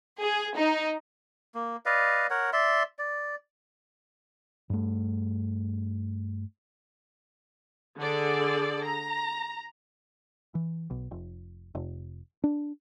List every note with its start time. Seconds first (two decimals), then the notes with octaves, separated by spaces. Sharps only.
0.20 G#4
0.57 D#4
1.55 A#3
1.86 B4 D5 D#5 F5
2.30 A#4 C#5 F#5
2.53 D5 E5 C6
2.99 D5
4.70 G2 A3
7.98 D3 G#4 A4 D5
8.84 A#5
10.55 E3
10.90 B1
11.11 F1
11.75 F1
12.44 D4